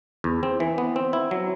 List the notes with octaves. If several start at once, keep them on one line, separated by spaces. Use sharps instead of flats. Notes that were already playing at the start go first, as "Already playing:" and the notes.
E2
C4
E3
B3
C4
E4
F#3